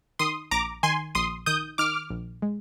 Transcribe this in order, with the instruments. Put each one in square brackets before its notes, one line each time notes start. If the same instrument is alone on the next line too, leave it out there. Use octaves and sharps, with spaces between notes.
[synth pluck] D#3 [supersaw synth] C6 D#6
[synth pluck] A#1 [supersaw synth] A#5 D6
[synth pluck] D#3 [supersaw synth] G#5 C6
[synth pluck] A#1 [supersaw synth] C6 D#6
[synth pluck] D#3 [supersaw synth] D#6 G6
[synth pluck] D#3 [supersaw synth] D6 F6
[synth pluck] A#1
G#3